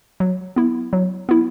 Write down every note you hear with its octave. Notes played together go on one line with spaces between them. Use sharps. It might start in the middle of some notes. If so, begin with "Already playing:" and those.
F#3
B3 E4
F#3
B3 E4